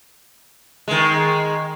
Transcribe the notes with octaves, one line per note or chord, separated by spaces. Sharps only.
D#3 G#3